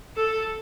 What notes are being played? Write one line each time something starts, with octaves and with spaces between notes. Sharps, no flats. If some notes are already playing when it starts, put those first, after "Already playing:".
A4